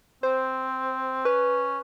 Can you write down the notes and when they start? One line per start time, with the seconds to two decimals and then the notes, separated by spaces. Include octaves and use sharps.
0.23 C4 C5
1.25 C#4 B4